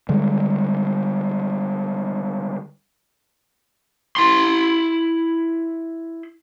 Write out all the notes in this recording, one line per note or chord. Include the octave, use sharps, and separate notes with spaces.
D3 G3 G#3
E4 C6